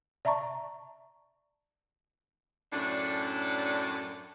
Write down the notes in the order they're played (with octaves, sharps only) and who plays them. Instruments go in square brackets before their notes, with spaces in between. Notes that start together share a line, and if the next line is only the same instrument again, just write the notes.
[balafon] D5 E5 A5 A#5 C#6
[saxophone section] F#2 A2 D4